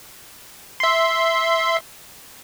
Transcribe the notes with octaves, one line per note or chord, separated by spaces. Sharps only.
E5 C6